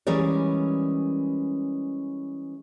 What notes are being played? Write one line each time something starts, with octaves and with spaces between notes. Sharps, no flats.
E3 G3 G#3 C#4 A#4 D5